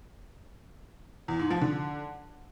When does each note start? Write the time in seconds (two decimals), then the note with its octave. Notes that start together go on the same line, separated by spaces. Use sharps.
1.28 E2
1.39 G#2
1.50 F3
1.61 D3